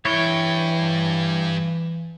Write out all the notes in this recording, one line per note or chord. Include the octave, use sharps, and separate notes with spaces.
G2 E3 E4 C#5 G5